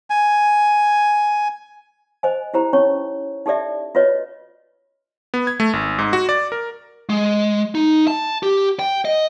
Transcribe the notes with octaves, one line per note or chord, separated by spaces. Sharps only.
G#5
C5 D#5 G#5
E4 G4 C5 A#5
C#4 D#4 C#5 C#6
D#4 G4 A4 D5 E5
F4 F#4 B4 C#5 D#5
B3
G#6
A3
G#1
G#2
F#4
D5
A#4
G#3
D#4
A5
G4
G5
D#5